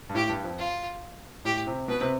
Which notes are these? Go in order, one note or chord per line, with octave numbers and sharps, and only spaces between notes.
G2
A2 G4
G2
F2
F4
A2 G4
C3
B2 B4
C3